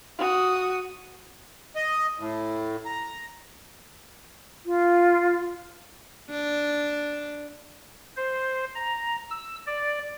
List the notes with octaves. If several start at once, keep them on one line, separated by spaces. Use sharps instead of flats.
F#4 D#6
D#5
A2
A#5
F4
D4
C5
A#5
E6
D5